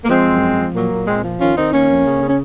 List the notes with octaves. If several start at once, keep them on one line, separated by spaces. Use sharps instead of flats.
A#3
F3 G#3 C4
F#2
F3
F3
A#2 F#3 A#3
A#2
A#2 G#3 C4
F3
D#3 C#4 F4
D#3 C4 D#4
D#3 A#3 C#4
F2
C#3
C#3
C#4